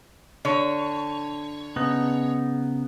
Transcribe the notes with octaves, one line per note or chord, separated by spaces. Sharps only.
D3 C#5
C#3 B3 D#4